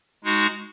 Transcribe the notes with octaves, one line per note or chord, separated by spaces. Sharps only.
G#3 D#4 F#4